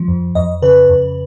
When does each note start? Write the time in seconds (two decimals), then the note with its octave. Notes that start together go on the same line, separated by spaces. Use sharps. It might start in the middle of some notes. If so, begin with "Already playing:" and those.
Already playing: F3
0.08 F2
0.35 F2 D#5
0.62 C#3 B4
0.90 F2